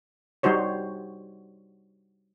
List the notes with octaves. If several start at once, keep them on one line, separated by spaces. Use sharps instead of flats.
G3 D#4 F#4 C5 C#5